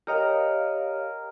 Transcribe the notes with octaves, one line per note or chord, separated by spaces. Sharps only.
G4 A#4 C#5 D#5 F5 G5